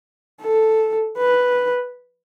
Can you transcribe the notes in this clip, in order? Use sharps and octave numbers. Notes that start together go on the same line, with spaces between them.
A4
B4